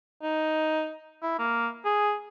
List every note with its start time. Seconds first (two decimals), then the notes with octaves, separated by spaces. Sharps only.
0.23 D#4
1.23 E4
1.39 A#3
1.85 G#4